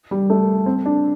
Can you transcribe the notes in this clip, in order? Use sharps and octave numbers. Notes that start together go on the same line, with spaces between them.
G3
A3
C4
D4